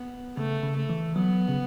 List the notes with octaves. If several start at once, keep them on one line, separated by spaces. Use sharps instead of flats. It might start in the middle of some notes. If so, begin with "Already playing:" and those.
Already playing: B3
C#3 A3
C#3
A3
E3
F#3 B3
C#3